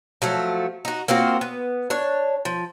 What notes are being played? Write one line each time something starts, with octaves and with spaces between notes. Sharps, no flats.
F3 F#3 A3
D#4 F#4
A#3 C4 F4 F#4
B3
D4 C#5
F3